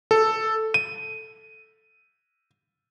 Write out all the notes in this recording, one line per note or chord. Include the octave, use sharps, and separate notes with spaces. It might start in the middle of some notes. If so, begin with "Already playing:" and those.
A4
D#7